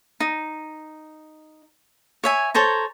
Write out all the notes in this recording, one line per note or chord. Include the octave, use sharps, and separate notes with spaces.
D#4
C#5 E5 G#5
A4 C5 C#5 A#5